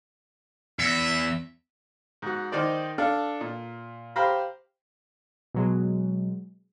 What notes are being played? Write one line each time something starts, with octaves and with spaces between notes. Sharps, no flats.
E2 E5
G#2 F#4
D#3 D#4 C5 D5
D4 A4 F5
A#2
G4 C5 F5 A#5 B5
B2 F#3 G#3